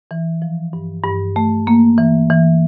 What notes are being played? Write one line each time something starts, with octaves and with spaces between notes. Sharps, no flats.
E3
F3
G2
G2
A3
A#3
E3
E3